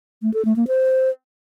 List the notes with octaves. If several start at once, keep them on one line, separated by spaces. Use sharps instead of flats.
A3
A4
A3
A#3
C5